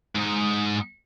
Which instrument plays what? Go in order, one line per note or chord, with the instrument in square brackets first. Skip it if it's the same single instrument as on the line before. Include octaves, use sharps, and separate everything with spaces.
[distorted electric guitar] G#2 D#4